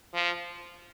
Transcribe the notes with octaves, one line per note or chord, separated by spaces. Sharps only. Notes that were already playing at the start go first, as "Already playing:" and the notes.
F3